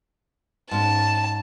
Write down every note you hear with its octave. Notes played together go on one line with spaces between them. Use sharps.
G#2 C#4 A5